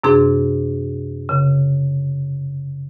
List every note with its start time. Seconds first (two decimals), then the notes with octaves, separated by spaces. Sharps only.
0.03 F#2 C3 D4 G#4 C6
1.29 C#3